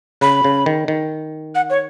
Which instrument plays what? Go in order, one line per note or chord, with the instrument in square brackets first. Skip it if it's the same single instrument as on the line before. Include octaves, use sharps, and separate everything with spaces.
[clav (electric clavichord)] C#3 [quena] B5
[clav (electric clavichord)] C#3
D#3
D#3
[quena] F#5
C#5